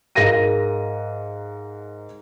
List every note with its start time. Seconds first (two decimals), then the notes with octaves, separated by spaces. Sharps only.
0.15 G#2 A#4 F5 A#6 D#7